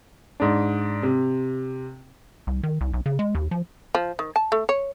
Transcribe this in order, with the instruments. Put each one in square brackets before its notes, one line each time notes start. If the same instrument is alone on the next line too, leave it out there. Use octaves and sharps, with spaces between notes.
[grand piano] G#2 D4
C3
[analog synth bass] C2
D#3
C2
B1
C#3
G#3
D#2
F3
[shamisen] F3
D#3
A5
A3
C#5